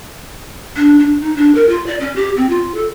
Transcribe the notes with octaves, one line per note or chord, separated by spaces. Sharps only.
D4
D4
D#4
D4
A#4
F4
D5
C#4
G4
C4
F4
A4